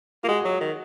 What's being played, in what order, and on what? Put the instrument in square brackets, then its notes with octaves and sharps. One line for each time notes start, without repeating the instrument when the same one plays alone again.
[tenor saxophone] A#3 [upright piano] F4
[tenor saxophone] G#3 [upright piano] F#4
[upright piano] G#4
[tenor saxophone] F#3
[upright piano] G#4
[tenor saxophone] D#3